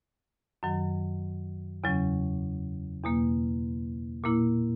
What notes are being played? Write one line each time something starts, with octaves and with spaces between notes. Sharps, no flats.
F#2 D#3 F#3
E2 C#3 F#3 C#4
E2 B2 A#3
A#2 A#3 E4